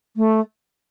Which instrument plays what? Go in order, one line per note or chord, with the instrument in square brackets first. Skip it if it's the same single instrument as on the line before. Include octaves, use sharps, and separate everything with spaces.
[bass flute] A3